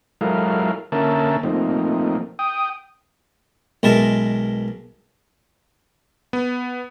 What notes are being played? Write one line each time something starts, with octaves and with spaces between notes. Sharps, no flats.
F#3 G#3 E4 A4 A#4 F5
D3 A#3 C#4 A#4 E5 A5
F3 A3 A#3 C4 D#4
G5 D#6
B1 G#3 A#4 E5 A5
B3